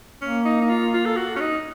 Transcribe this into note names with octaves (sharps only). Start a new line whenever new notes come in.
A#3 C#4
D#4
D#4
F4
F4
A4
F#4
C#4
D#4